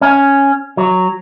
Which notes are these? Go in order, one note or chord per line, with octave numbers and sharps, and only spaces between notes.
C#4
F#3